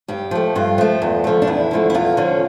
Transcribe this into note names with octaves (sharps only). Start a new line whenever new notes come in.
G2 G4
F3 A3
G2 F4
F3 A3
E2
D3 F3 A3
D4
E2 E4
D3 F3 A3
E4
E2 F4
D3 F3 C#4